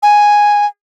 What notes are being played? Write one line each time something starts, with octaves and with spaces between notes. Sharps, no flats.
G#5